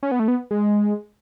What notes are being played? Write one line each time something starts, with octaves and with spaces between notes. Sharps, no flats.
C#4
B3
A3
B3
G#3